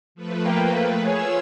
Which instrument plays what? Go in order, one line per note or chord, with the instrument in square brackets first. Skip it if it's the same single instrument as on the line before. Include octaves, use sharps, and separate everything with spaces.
[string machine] F3 A3 B4
[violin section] A#3 G5
[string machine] F4 E6 [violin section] G#4 C#5